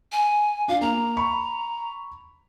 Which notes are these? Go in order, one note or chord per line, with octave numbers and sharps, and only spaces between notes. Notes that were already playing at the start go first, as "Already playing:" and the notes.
G#5
D4 F4 F5
A#3 A#5
B5 C#6